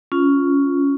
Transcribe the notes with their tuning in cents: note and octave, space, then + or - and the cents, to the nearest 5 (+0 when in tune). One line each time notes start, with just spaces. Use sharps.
C#4 +10 F4 +0